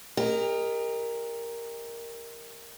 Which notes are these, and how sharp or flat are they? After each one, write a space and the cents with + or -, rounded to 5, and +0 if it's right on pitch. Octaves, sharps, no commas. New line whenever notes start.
G4 +40 A#4 +0 D#5 +0